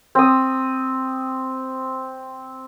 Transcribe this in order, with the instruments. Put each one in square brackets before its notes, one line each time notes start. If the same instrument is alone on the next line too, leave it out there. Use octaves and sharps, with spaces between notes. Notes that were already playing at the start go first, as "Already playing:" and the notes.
[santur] C4 D#6